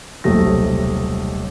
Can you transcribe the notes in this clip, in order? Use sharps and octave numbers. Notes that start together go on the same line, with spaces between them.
D#1 B1 C3 A3 D#6 A#6